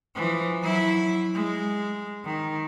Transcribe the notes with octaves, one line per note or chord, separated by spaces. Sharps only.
E3 F3
F#3 E4
G#3
D#3